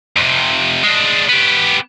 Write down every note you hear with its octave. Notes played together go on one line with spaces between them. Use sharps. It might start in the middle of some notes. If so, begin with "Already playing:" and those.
F2 C3
G#3 D4
B3 G4